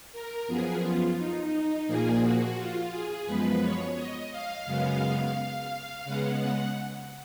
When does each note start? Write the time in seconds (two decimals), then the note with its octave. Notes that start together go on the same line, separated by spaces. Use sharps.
0.13 A#4
0.48 F#2 F3 B3 G#4
0.83 F4
1.18 D#4
1.52 D#4
1.87 A#2 F3 A#3 G#4
2.22 F#4
2.57 F4
2.91 G#4
3.27 F#2 F3 G#3 B3 B4
3.61 C#5
3.96 D#5
4.32 F5
4.66 F#2 C#3 G#3 B3
6.05 C#3 G#3 B3 F#5
6.40 F#5